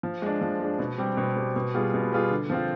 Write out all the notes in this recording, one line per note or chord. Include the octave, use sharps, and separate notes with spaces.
F3
G#3 D4
F3
G#3 D4
B2
G3 C4 G4
B2
G3 C4 G4
B2
G3 B3 F4 G#4
B2
G3 B3 F4 G#4
D3
F3 C4 F4